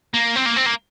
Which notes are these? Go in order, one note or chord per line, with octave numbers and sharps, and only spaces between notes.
A#3
C4
A#3
C4
A#3